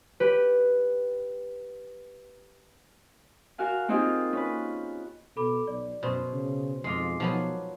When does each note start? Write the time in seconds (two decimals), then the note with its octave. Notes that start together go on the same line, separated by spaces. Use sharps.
0.20 G4 B4
3.58 F#4 A#4 F5 G#5
3.88 A#3 C4 D#4 F4 G4 G#4
4.33 C#4 B4
5.37 B2 A4 B5 D6
5.67 B1 D5
6.03 F#2 B2 C5 C6
6.33 C#3
6.84 F2 G#3 F4 D6 C7
7.20 B2 F3 F#3 B3